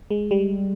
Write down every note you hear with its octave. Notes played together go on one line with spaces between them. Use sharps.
G#3
G3